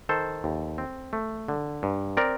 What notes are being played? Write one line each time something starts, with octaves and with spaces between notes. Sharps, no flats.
D#3 A4 C5
D#2
C4
A3
D3
G2
C4 A#4 D5